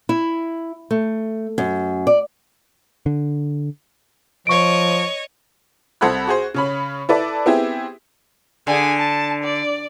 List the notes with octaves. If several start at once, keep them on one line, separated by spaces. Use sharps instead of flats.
E4
A3
F#2
D5
D3
F3 C#5 D#5 C#6 D7
C2 A4 C5 F#5 B5 G#6
F#4 G#4 C5
C#3 C#4 B5
E4 A4 B4 D5
B3 C4 E4 G4 G#4
D3 G#4 G#5
A5
D5